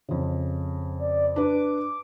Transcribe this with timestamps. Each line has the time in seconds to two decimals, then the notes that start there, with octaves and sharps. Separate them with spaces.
0.09 F2 C#3
0.99 D5
1.36 D4 B4 D6